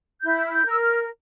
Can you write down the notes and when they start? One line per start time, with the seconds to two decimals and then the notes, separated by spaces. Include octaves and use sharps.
0.22 E4 G6
0.46 F6
0.51 G6
0.65 A#4 E6
0.79 F6